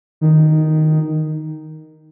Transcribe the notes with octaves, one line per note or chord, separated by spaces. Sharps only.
D#3